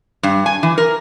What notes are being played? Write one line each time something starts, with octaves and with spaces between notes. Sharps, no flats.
G2
G#5
E3
A#4